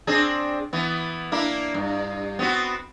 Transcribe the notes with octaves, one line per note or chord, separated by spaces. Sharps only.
C4 D4 G#4
E3 B3
A#3 D4 E4
G2
B3 C4 F#4